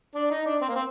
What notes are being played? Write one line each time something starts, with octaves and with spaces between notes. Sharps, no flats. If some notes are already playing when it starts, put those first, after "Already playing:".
D4
D#4
D4
C4
A#3
C4